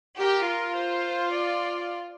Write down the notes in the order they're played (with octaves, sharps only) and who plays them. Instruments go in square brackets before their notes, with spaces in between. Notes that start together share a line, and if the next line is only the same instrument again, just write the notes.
[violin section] G4 [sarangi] A#4
[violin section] F4
[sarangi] C5
D5